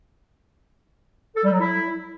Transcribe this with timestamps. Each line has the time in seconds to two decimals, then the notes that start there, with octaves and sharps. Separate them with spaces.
1.36 A4
1.44 G3
1.52 F#3
1.60 E4